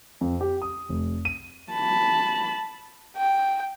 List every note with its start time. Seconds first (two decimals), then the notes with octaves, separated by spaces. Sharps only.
0.21 F2
0.41 G4
0.62 D#6
0.89 F1
1.25 D#7
1.72 A5 B5
3.16 G5